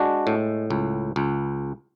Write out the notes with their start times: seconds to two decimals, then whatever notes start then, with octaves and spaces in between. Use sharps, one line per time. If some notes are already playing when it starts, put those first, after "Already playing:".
Already playing: G#3 D4 F#4
0.27 A2
0.71 C#2
1.16 C#2